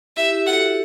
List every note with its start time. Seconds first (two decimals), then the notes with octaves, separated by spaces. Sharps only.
0.17 E4 G4 E5
0.31 E4 G4
0.46 F#4 A4 F#5